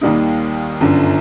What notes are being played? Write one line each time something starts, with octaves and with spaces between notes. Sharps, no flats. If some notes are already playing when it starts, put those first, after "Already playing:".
D#2 D#3 G3 A#3 D#4
G1 F#2 D3